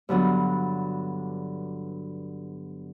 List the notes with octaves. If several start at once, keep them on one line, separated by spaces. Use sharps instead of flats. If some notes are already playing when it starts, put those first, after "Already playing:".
G2 D3 F#3 B3